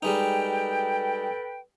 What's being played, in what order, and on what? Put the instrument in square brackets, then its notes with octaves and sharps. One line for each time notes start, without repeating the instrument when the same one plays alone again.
[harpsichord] G3 G#3 D#4 [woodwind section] A4 B4 G5